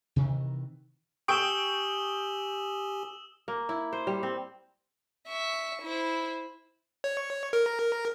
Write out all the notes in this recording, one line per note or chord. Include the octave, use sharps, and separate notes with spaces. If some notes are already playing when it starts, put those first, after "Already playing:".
C3 D#3 E3
G4 G5 G#5 C#6 D#6 E6 D7 E7
A#3
E4
C5
G3
C4
E5 C#6
E4 C5
C#5
A#4